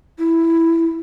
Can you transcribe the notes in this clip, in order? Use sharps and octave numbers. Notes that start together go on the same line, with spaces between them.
E4